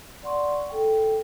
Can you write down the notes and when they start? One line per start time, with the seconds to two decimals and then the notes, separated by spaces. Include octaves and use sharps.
0.23 D5 F#5 C6 C#6
0.70 A4 G5